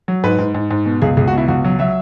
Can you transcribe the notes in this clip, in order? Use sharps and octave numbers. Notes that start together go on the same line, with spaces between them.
F#3
G#2 B4
G#2
G#2
G#2
B2
C#2 G#4
C#2 G#4
F#4
B2 E4
C#2 F#4
F#3
F#3 E5